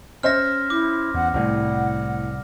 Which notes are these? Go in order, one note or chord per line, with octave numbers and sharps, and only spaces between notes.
C#4 C5 E5 F6 A#6
E4 D6
E2 F#5
C2 A2 G3 F#5